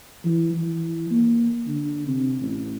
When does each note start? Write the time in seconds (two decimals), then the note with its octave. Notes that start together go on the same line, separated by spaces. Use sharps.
0.25 E3
0.54 E3
1.11 A#3
1.67 D3
2.07 C3
2.40 A1